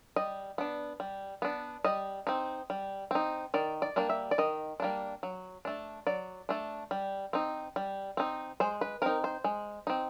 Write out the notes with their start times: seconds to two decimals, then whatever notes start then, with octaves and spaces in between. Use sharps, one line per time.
0.16 G3 D#5
0.58 B3 D4
1.00 G3
1.42 B3 D4
1.85 G3 D#5
2.27 C4 D#4
2.70 G3
3.11 C4 D#4
3.54 D#3 D5
3.82 D5
3.96 G3 A#3 D4
4.10 E5
4.31 D5
4.38 D#3 D#5
4.80 G3 A#3 D4
5.23 F#3
5.65 A3 D4
6.07 F#3 D5
6.49 A3 D4
6.91 G3
7.33 C4 D#4
7.76 G3
8.17 C4 D#4
8.60 G#3 C5
8.81 B4
9.02 C4 D#4 A#4
9.24 C5
9.44 G#3
9.87 C4 D#4